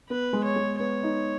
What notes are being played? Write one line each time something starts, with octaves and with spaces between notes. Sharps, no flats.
B3 B4
G#3
C#5
G#3
B3 C#5
D#4